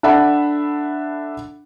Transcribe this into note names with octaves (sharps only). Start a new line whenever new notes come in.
D4 A4 E5 F#5 B5